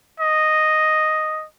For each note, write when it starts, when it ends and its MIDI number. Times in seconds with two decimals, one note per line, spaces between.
0.20 1.45 75